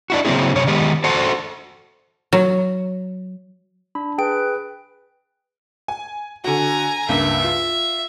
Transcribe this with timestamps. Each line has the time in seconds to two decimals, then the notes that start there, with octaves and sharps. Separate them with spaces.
0.10 D4 E4 F#4
0.25 C#3 F#3 A#3 C4 E4 G#4
0.55 F#2 C3 C#5
0.67 D#3 G#3 B3 G4 G#4
1.04 F#4 A4 C5 F#5 A5
2.33 F#3
3.95 D4 B5
4.18 G#4 B4 G5 D7
5.88 G#5
6.44 D3 F#4 G#5 A#5
7.09 C#2 G2 A#3 E5
7.44 F4